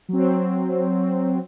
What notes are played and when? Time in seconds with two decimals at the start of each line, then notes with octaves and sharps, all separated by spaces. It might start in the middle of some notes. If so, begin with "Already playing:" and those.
0.09 F#3 C4